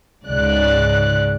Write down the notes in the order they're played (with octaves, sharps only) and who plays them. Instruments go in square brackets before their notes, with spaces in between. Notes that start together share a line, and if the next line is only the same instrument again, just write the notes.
[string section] C#2 G#2 D5 F#6